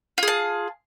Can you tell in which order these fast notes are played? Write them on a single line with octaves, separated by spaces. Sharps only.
F4 G#4 A5